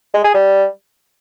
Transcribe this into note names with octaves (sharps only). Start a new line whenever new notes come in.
G#3
G#4
G3